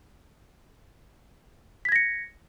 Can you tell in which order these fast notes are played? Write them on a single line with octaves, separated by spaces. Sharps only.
B6 G#6 A#6 C#7